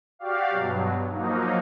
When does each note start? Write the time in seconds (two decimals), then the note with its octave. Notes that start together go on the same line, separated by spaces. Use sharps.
0.19 F#4 G4 D5 F5
0.50 G2 B2 F#3
1.11 F3 F#3 A#3 D#4